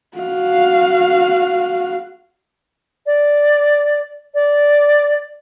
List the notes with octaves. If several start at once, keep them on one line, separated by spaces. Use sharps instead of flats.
F#4 F5
D5
D5